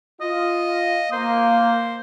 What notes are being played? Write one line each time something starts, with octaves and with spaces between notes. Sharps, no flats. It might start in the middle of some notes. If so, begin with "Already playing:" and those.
F4 D#5
A#3 C5